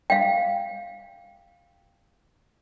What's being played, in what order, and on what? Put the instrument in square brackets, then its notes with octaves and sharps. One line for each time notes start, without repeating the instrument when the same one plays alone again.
[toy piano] F5 G5